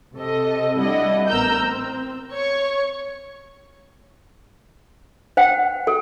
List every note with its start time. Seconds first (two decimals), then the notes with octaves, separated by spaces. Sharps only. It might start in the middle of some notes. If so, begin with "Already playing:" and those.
0.15 C3 A4 D#5
0.78 G3 D4 E4 D5 D#5 F#5
1.28 A1 B3 A#4 A#5 E6 G6
1.61 C4
2.32 C#5 C#6 G#6
5.37 C5 F#5 G5
5.87 A4